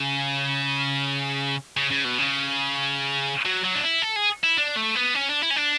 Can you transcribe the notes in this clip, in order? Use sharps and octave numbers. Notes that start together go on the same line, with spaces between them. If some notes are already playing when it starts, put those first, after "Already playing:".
Already playing: C#3
C#3
C#3
B2
C#3
F#3
F#3
D4
E4
A4
G#4
E4
D4
A3
B3
C#4
D4
E4
C#4
D4